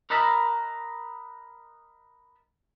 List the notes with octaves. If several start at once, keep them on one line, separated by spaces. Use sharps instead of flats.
A#4 B4 D#5 E5 A5 B5